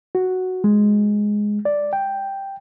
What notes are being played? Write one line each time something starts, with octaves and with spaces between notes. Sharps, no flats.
F#4
G#3
D5
G5